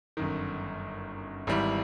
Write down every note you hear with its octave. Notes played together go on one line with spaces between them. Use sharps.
G1 F#2 D#3
G#1 G#2 E3 G3